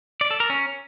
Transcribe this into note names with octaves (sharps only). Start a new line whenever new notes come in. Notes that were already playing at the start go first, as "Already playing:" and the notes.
D5
A4
A#4
C#4